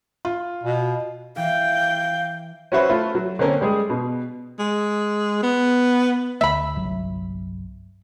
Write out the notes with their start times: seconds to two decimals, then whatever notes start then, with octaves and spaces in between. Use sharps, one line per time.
0.25 F4
0.63 B2
1.37 E3 F5 G5 G6
2.72 C#4 E4 F#4 B4 C5 E5
2.89 A3 E4 F4
3.15 F#3
3.39 D3 A#3 C4 C#4 A#4
3.61 G3 G#3 G#4
3.90 B2
4.59 G#3
5.43 B3
6.41 D2 A3 E5 B5
6.76 G1 C2 F#3